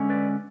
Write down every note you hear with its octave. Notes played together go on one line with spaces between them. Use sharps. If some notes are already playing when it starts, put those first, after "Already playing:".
Already playing: D3 G#3 C#4
B4 D5